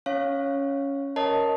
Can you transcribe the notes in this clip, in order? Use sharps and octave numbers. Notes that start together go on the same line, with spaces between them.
C#4 C#5 F5
A#4 C#5 D#5 A5